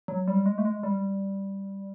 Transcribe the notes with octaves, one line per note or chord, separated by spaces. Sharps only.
F#3
G3
G#3
A3
G#3
G3